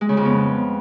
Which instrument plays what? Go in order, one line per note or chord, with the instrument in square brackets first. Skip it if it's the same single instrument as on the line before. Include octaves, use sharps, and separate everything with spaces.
[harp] G#3
C#3
F2
B3